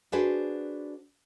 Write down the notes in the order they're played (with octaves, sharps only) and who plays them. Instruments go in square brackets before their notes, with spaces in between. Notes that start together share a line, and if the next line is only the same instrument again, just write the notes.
[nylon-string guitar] D4 F#4 G#4 B4 C5 D5